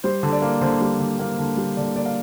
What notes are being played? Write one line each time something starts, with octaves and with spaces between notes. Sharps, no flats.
G3 C5
D3
D5
A#3
D3 C5
G3
D3
A#3
D3
G3
D3 D5
A#3 D5
F5